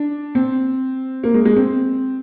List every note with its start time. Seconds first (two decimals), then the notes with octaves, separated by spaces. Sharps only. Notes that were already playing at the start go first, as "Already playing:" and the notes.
Already playing: D4
0.35 C4
1.24 A#3
1.34 G#3
1.45 G#3
1.56 C4